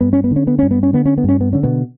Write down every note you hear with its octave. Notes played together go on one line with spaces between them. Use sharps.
G2 B3
C#4
B3
D3 C#4
B3
G2 C#4
B3
C#4
D3 B3
C#4
B3
G2 C#4
B3
D3 C#4
B2 B3